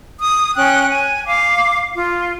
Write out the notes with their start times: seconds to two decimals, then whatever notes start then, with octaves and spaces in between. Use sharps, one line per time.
0.19 D#6
0.55 C#4 G5 F#6
0.88 G#5
1.26 F5 D6
1.95 F4